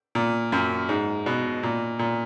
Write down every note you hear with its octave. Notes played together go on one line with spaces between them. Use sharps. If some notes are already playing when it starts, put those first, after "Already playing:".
A#2
F#2
G#2
B2
A#2
A#2